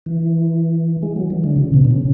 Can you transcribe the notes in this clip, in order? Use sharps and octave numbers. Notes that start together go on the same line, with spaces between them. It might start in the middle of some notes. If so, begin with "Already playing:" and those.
E3
G#3
F#3
E3
D3
C#3
B2
B2
C#3